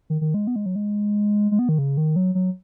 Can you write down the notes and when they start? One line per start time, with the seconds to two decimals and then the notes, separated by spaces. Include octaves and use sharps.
0.10 D#3
0.21 D#3
0.34 G#3
0.47 B3
0.56 G#3
0.66 F#3
0.76 G#3
1.51 G#3
1.59 B3
1.69 D#3
1.78 C#3
1.97 D#3
2.16 F#3
2.35 F#3